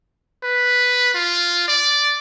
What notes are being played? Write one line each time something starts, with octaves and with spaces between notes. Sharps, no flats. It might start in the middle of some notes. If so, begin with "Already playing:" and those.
B4
F4
D5